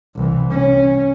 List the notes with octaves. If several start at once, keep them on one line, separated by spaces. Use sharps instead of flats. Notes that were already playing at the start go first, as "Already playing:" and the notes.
C2 E3
C#4